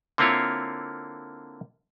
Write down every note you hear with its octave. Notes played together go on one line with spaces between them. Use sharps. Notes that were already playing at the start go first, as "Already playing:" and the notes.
D3 A#3 C4 E4 F4 C#5